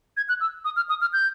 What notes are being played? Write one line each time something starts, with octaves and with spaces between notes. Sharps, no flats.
G#6
F#6
E6
D#6
F6
D#6
F6
G6